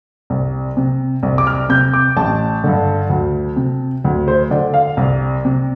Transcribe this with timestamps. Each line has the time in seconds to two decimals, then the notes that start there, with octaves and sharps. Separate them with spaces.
0.30 C2
0.77 C3
1.23 C2
1.38 D6
1.47 F6
1.69 C3 G6
1.93 D6
2.17 A1 A5
2.64 G2 D3
3.10 D2
3.56 C3
4.04 D2
4.28 C5
4.51 D3 D5
4.74 F5
4.97 C2 D5
5.45 C3